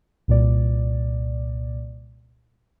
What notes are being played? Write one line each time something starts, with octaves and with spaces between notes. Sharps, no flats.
C2 A#2 D5